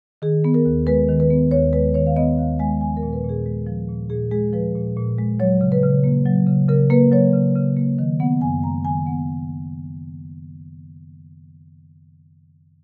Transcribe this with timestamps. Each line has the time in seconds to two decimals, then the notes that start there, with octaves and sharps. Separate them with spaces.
0.22 D#3 G#4
0.44 B3
0.54 A#4
0.65 D#2
0.87 G#3 B4
1.09 D#3
1.20 B4
1.30 B3
1.51 D#2 C#5
1.73 G#3 B4
1.94 D#3 C#5
2.06 F5
2.16 B3 D#5
2.38 D#2 F5
2.59 G#3 G#5
2.81 F3 G#5
2.97 A#4
3.03 A#2
3.13 B4
3.24 A#2
3.29 G#4
3.46 G#3
3.67 F3
3.89 A#2
4.10 A#2 G#4
4.31 G#3 G#4
4.53 F3 B4
4.75 A#2
4.96 A#2
5.18 G#3
5.40 F#3 C#5
5.61 C#3
5.72 B4
5.83 C#3
6.04 A#3
6.26 F#3
6.47 C#3
6.68 C#3 A#4
6.90 A#3 B4
7.12 F#3 C#5
7.34 C#3
7.56 C#3
7.77 A#3
7.98 D#3 D#5
8.20 B3 F#5
8.41 F#2 G#5
8.63 G#3 A#5
8.85 D#3 G#5
9.06 B3 F#5